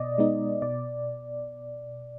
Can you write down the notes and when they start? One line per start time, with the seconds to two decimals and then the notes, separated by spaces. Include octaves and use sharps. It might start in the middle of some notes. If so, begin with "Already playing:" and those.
Already playing: B2 D5 D#5
0.18 G#3 B3 D#4
0.62 B2 D5